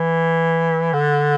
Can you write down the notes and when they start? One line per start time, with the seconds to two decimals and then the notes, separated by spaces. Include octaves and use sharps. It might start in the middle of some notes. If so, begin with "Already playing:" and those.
Already playing: E3
0.93 D3